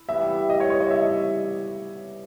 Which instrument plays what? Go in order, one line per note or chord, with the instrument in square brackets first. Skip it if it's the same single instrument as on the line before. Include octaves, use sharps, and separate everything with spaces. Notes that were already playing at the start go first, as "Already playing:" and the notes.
Already playing: [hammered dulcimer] E4
[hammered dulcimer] E3 G3 B3 G4 [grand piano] E5
[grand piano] D#5
C#5
C#5
D#5
E5
D#5